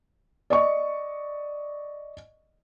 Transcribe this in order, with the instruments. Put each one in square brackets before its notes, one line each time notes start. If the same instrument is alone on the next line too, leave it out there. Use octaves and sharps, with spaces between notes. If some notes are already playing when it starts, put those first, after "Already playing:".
[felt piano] D5 D#5 C#6